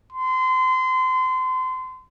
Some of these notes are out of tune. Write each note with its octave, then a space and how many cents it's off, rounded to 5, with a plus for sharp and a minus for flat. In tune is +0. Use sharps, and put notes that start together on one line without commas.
C6 -30